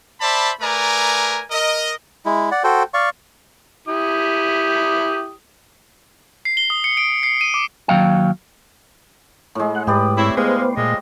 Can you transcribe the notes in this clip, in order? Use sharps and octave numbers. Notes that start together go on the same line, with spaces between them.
C5 D5 E5 A5 B5
A3 A#4 B4 D5 G#5 A#5
A#4 D#5
G#3 E4
D5 F#5
F#4 A4 C5 G5
D5 F5 C#6
E4 G4 D#6
C7
G7
D#6
C#7
D7
C7
D#7
D6
D#2 E3 F#3 F5 G5
A2 G#3
F#5
G#2 G4 B4 D5 D#6
C4 E4 C#5
G#3 B3 C5 F5
A#2 G#3 F4 C5 D#5